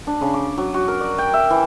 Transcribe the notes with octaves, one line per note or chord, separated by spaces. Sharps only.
D4
C#3
D6
F#3
F#4
A#4
D5
G5
E5
E3